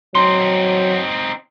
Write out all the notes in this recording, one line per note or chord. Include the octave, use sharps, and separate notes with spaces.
F#3 C4 D#4 C6